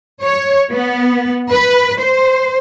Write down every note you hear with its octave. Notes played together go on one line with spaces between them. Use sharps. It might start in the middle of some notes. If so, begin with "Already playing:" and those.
C#5
B3
B4
C5